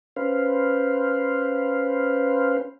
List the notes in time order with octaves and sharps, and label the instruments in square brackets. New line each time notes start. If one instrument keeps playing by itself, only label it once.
[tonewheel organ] C#4 B4 C5 F5